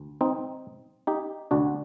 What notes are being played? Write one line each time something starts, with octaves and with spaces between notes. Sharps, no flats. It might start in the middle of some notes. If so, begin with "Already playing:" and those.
Already playing: D2
C4 D#4
D#4 G4
D2 D3 D4 F#4